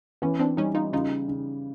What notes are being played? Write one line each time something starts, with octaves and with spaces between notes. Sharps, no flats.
E3 B3 C#4
C4 D4
G3 C#4 D#4
D#4 F4
C#3 D#4 F4
C#3